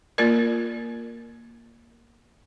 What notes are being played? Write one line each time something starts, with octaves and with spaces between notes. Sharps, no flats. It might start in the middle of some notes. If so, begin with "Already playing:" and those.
A#3 F4 A#4 D5